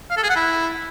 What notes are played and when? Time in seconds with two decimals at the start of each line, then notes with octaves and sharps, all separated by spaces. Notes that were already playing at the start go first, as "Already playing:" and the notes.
0.10 F5
0.17 A4
0.23 G#4
0.30 F#5
0.36 E4